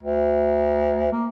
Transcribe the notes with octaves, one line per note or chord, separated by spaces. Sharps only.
D2
A#3